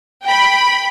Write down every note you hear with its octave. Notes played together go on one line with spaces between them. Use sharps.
G5 B5